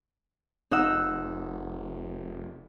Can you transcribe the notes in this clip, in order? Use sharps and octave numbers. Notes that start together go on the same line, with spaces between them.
F1 D#4 F#5 E6